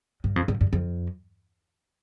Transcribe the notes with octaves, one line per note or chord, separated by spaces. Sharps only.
G2
F2
G2
G2
F2